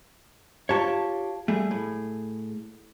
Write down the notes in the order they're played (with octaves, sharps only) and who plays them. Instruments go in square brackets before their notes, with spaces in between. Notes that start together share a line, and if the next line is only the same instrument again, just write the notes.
[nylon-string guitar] F4 G4 [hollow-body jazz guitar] C#5 A5
[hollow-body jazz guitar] G3 A3 [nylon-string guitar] G#4
[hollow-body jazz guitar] A2